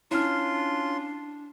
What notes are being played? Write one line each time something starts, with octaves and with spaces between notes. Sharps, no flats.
C#4 D4 E4 F4 C6 F6